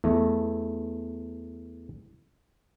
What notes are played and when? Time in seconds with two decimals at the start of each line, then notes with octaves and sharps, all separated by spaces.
0.04 E2 A3